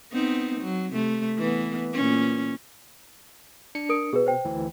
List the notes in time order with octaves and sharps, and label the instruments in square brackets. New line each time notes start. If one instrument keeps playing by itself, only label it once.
[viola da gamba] B3 C4 D#4
F#3
C3 A3
E3 B3
A#2 C#4
[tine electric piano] D4 C#7
[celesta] A#4 D#6 D7
[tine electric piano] B2 [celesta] G#4 B4
[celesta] C5 G5
[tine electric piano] D2 E3